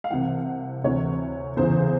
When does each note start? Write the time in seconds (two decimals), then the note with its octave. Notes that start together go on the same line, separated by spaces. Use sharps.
0.04 F5
0.10 C2 C3 E3 F#5
0.83 D2 C3 E3 C#5
1.57 E2 C#3 E3 C5